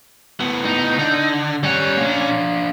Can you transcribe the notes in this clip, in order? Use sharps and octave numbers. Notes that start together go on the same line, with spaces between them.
A2 B3
D#4
D3
G3 C#4 F#5
A#3 D4